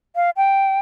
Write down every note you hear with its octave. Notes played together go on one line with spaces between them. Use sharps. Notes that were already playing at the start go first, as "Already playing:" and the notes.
F5
G5